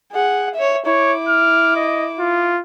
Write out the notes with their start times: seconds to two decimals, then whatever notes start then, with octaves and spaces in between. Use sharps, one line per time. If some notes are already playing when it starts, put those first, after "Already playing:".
0.12 G#4 F#5
0.55 C#5 E5
0.86 E4 C#5 D6
1.28 F6
1.76 D#5
2.19 F4